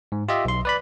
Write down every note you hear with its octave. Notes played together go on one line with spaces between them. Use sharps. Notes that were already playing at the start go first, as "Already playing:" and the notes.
G#2
F4 G4 D#5 E5
B1 C6
B4 D5 B5